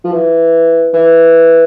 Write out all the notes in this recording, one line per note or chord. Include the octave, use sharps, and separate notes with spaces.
F3
E3
E3